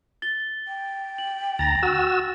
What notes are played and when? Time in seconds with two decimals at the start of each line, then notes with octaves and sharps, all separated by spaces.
0.22 A6 G7
0.68 G5
1.18 F#7
1.59 D2 A#5 A6 A#6
1.83 F#4 E6